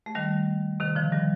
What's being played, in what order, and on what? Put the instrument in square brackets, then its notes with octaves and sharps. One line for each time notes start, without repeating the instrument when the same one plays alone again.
[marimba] A3
D#3 G3
C3 D#3
D3 F3
D#3 G3